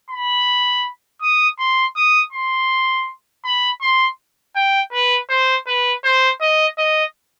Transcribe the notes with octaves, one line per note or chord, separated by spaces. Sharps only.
B5
D#6
C6
D#6
C6
B5
C6
G5
B4
C5
B4
C5
D#5
D#5